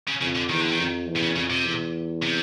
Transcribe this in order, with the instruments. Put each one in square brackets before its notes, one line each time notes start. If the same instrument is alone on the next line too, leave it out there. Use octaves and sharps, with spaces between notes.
[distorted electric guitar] C#3
[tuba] F2 [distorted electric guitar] C#3
[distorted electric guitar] D3
[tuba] E2 [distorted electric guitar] D#3
[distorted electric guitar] D3
D#3
[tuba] F2
E2
[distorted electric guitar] C3
C#3
[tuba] F2 [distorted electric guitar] C#3
[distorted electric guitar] C3
[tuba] E2
[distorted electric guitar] C3